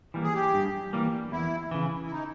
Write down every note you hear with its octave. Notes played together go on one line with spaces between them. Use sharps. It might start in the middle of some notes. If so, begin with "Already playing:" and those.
E3 G3 A#3
G#4
G4
G2
E3 G3 A#3
E2 E4
C#3 E3
E4
D#4